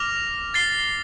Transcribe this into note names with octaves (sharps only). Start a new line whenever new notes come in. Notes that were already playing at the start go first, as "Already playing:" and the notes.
Already playing: D6 F6 A#6 F7
A6 C7 G7